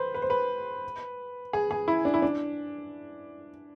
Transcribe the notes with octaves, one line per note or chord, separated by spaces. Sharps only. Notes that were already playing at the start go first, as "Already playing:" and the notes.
Already playing: B4 C5
B4
C5
B4
G#4
G#4
E4
D4
E4
D4